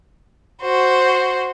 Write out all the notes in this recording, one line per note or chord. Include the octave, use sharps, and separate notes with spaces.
F#4 C5